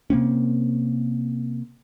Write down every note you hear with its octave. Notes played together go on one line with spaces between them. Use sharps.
C3 A#3 C4 C#4